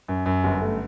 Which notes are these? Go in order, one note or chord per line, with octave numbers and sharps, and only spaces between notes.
F#2
F#2
G1
A3